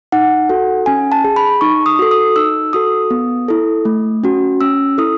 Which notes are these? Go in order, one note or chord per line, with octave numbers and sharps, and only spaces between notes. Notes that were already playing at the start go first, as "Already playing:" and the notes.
D#4 F#5
F#4 A4
C#4 G#5
A5
G#4
B5
D#4 C#6
D#6
F#4 A4
D#6
D#4 E6
F#4 A4 D#6
B3
E4 A4
A3
C#4 F#4
C#4 E6
E4 A4 D#6